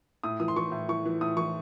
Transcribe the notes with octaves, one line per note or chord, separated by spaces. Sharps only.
A2 D#6
E3 D#6
C6
E3 C#6
A2
E3 C#6
E3
A2 D#6
E3 C#6